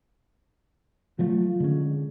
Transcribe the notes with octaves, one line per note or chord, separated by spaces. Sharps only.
F3 F#3 A3 F4
D3 G#3 C#4